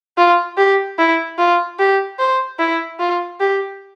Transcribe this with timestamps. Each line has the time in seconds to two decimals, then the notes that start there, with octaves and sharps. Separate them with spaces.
0.17 F4
0.57 G4
0.99 E4
1.38 F4
1.79 G4
2.19 C5
2.59 E4
3.00 F4
3.40 G4